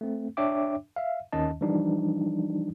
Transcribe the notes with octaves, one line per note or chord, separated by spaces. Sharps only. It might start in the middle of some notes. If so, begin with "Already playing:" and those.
A3 C4
D4 C#5 E5 G5 D6
E5 F5
D#2 D#3 C#4 D#5 A5
E3 F3 G3 D4 D#4